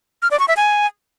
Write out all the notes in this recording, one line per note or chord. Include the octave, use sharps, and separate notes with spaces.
F6
D5
C#6
E5
G#5